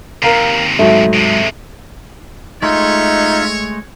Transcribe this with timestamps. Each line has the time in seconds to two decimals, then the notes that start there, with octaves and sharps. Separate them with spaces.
0.22 D#2 C3 A#4 F5 A#5
0.79 G#2 F#3 A3
1.13 C3 G#3
2.62 G#3 A3 D#4 F4 C#5 E5 C6